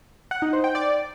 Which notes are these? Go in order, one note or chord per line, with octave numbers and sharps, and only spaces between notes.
F#5
D#4
C5
G5
D5